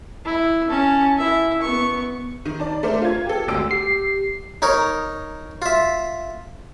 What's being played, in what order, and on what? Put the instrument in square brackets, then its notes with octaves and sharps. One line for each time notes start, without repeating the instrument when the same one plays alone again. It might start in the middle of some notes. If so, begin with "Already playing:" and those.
[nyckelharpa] E4
C#4 A5
E4 E5
B3 C#6
[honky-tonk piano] D#3
D5 A5
A3 D4 A#4 C5
F4 G#6
G4 A4
G#1 D2 D3 E6 D7
[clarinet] G4 [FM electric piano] C7
[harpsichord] D#4 A#4 C#5
F4 E5